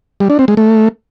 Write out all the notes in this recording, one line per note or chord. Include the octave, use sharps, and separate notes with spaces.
G3
D4
C4
G#3
A3